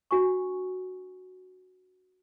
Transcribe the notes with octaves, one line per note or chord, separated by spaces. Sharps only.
D4 F#4 G#5 C#6